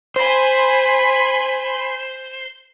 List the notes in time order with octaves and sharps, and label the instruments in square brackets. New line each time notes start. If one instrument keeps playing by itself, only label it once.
[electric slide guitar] C5 [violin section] G#5 B5 C6